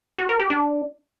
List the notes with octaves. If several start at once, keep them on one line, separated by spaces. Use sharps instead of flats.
F#4
A#4
G4
D4